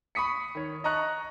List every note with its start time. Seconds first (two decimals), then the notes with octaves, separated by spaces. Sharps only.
0.15 B5 C#6 D#6 B6 C#7
0.55 D#3 C#5
0.84 D#5 A5 A#5 C#6 D#6 F#6